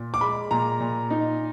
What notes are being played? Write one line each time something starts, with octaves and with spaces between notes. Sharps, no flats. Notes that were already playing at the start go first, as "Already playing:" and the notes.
Already playing: A#2
D6
G#3 B5
A#2 A#5
A#2
D#4